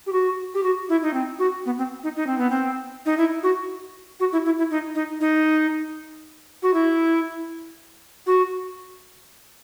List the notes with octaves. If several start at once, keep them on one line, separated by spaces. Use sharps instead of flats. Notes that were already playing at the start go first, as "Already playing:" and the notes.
G4
F#4
G4
F#4
E4
D#4
C4
F#4
B3
C4
D#4
D#4
C4
B3
C4
D#4
E4
F#4
F#4
E4
E4
E4
D#4
D#4
D#4
F#4
E4
F#4